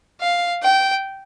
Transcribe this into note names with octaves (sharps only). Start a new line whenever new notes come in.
F5
G5